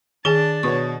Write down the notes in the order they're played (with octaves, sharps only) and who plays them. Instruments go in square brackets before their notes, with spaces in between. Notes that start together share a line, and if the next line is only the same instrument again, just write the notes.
[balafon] D#3 G#4 G#5 [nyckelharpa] D4 A5 [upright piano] G7
[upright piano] B2 C#5 [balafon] C#6